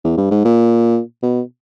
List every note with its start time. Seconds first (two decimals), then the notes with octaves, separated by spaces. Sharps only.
0.04 E2
0.17 G2
0.31 G#2
0.45 A#2
1.23 B2